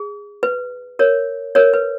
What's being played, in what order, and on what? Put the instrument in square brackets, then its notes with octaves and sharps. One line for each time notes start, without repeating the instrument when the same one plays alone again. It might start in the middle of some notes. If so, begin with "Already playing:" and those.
Already playing: [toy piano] G#4
B4
A#4 C#5
A#4 C#5
B4